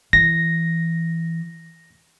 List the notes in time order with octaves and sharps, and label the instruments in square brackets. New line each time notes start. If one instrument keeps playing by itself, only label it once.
[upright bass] E3 [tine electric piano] A#6